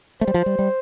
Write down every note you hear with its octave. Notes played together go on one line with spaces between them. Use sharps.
A3 C5
G3
F3
G3
G3